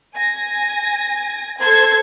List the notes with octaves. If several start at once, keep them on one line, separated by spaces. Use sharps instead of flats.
G#5 A#6
A4 C5 G#6